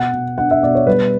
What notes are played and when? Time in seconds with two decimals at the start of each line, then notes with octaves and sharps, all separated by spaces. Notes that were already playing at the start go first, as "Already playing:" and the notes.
Already playing: B2 F#5
0.13 B2
0.38 D4 F#5
0.51 E5
0.63 B2 D5
0.75 C#5
0.87 G3 B4